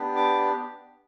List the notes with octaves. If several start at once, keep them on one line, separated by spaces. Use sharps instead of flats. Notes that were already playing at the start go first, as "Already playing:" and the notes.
Already playing: B3 D4 G4
D6